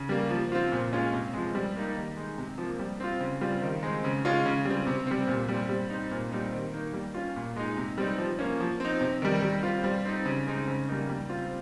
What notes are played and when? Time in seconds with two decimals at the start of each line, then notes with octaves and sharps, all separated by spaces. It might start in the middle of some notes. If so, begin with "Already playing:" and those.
Already playing: C#3
0.09 G3 A#3
0.30 F3
0.52 C4 F4
0.72 A#2
0.93 G#3 C#4 F4
1.13 C3
1.34 F3 G#3
1.55 G3
1.76 A#3 D#4
1.96 D#3
2.17 G#3 D#4
2.38 C3
2.58 F3 A#3
2.79 G3
3.00 C4 F4
3.20 C#3
3.41 G3 C4 F4
3.62 D#3
3.83 G#3 C4
4.04 C#3
4.25 G#3 C#4 F4
4.46 C#3
4.65 G3
4.70 C4
4.87 C3
5.07 G3 C4
5.28 A#2
5.48 G3 C4
5.69 G3
5.90 C4 D#4
6.11 A#2
6.31 G3 C4 D#4
6.53 D#3
6.74 A#3 D#4
6.93 G3
7.14 C#4 F4
7.36 A#2
7.56 G#3 D#4
7.77 C3
7.98 G3 C4 D#4
8.18 F3
8.39 A#3 C#4
8.60 F3
8.80 C4 D#4
9.01 C3
9.22 D#3 G3
9.42 G3
9.63 C4 F4
9.84 G3
10.05 C4 D#4
10.26 C#3
10.47 G#3 C4 D#4
10.67 C#3
10.89 G3 A#3 D#4
11.09 G3
11.29 C4 F4